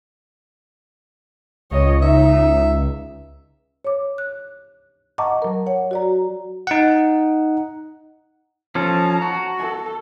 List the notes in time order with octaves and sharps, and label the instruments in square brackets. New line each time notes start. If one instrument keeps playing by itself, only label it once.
[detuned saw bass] C#2 [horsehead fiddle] C#5 D#5
[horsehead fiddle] D#4 [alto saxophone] E5
[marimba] C#5 D6
F#6
D#5 F#5 A5 A#5 C#6 D6
F#3 A#4
C#5 F#5
F#4 D5 A#5
[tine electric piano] D#4 F#5
[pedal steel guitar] F3 C#4 A4 [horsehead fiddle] A5 A#5
[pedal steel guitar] F#4
[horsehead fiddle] A4